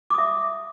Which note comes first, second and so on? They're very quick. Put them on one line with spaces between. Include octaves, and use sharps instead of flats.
D6 D#6 E5